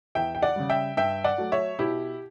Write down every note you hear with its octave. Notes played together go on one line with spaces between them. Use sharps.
E2 E5 G5
G5
D5 F#5
C#3 G3
E5 G5
G2 E5 G5
D5 F#5
F#3 A3
C#5 E5
B2 E4 G4